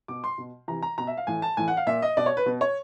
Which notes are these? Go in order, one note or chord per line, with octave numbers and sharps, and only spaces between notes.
B2 D6
C6
B2
C3 E3 A#5
A#5
B2 A#5
E5
F5
A2 E3 G#5
A5
A2 E3 G#5
F#5
F5
A#2 E5
D#5
B2 D5
C#5
B4
B2
C#5